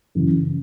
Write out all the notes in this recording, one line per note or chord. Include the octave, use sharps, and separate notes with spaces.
F#2 C#3 E3